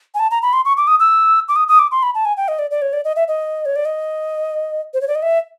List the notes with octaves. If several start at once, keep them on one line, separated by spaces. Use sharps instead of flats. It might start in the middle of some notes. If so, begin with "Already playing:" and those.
G#5
A5
A#5
B5
C6
C#6
D6
D#6
E6
D6
D#6
D#6
D6
C6
B5
A5
G#5
G5
D#5
D5
D5
C#5
D5
D#5
E5
D#5
C#5
D5
D#5
C5
C#5
D5
D#5
E5